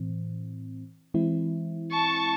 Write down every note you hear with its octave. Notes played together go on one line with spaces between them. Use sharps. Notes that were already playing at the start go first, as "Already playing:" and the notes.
Already playing: A2 E3 C4
E3 G#3 C4 E4
A5 C#6